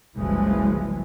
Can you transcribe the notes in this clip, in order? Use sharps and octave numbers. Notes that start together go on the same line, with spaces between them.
F#1 C2 E3 F3 G#3